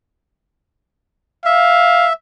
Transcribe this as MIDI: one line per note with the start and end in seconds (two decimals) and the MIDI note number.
1.46 2.13 76
1.46 2.09 77